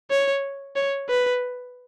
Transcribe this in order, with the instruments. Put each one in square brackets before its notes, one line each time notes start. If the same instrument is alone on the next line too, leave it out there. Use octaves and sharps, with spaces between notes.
[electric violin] C#5
C#5
B4